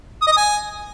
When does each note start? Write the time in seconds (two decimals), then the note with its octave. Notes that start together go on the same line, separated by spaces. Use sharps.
0.22 D#6
0.27 D#5
0.32 D#6
0.37 G#5